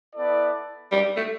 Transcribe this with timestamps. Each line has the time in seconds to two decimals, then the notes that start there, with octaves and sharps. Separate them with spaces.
0.16 B3 E4 A4 D5
0.91 G3
1.17 A3